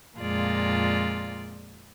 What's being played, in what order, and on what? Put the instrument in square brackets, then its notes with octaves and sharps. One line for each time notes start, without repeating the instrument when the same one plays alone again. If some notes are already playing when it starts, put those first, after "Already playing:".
[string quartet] F2 A#2 G#3 F4 D5